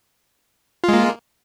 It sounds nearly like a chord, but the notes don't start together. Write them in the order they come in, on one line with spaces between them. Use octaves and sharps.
F4 G#3 A#3